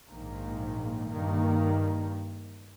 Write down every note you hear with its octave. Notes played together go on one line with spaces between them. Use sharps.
A#1 G#2 D#3 A#3
G2 D#3 A#3